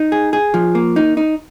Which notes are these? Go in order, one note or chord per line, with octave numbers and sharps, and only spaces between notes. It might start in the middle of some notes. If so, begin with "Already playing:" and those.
Already playing: D#4
G#4
G#4
F3
A#3
D#4
D#4